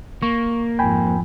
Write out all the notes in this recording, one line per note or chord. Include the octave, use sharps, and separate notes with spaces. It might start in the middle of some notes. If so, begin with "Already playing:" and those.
A#3 C#6
F2 G#2 G5 G#5 B5